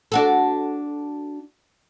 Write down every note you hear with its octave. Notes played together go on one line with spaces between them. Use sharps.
D4 F#4 A4